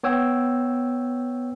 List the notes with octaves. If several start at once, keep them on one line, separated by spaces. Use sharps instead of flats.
B3 C#5 G5 E6